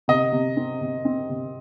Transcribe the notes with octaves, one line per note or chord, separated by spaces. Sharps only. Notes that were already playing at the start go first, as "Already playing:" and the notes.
C3 D#5
C3
C4
C3
C4
C3